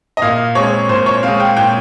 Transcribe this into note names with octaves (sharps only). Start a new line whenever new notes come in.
D#5
A#2 F5
G#3 C4 C#5
A#2 C5
C#5
G#3 C4 F5
G5
A#2 G5